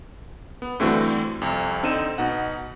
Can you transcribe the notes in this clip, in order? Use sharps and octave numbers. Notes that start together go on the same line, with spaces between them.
B3
G2 D3 E3 A3 C4 F#4
C2 F2
D3 C4 D#4 D#7 E7
B2 D#4 F#5